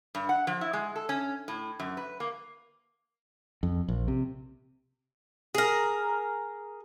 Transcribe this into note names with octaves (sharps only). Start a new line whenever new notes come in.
G2
F#5
F3
E4
G#3
A4
C#4
A2
F#2
B4
A#3
F2
A#1
C3
G#4 A#4